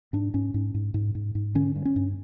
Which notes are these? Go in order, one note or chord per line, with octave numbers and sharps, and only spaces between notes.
G#2 D4
G#2 C#4
G#2
G#2
G#2
G#2
G#2
D3 C#4
G2
C#4
G2